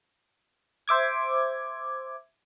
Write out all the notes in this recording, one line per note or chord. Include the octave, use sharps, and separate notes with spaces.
C5 E5 D6 G#6